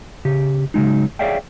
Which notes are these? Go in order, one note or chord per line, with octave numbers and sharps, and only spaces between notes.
C#3 G4
C#3 F#3 G#3 D#4
G#4 C#5 D5 E5 F5 G5